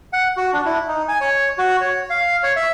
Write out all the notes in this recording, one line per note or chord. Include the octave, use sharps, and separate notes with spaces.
F#5
F#4
D4
E4
D#4
G#5
C#5
F#4
C#5
F5
C#5
E5